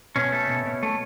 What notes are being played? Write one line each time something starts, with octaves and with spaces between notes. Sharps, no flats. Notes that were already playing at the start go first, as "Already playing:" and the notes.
B2 C#4
A3
B2
B2
A3